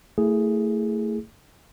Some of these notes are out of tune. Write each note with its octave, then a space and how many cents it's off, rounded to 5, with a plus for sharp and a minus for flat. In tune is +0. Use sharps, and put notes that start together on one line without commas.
A3 +25 E4 +0 G#4 +0